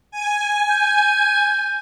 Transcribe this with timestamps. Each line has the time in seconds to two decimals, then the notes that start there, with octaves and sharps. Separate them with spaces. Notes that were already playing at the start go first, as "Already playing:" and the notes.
0.11 G#5
0.69 G6